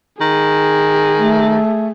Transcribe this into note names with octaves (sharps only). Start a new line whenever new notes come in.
D#3 G#4
A3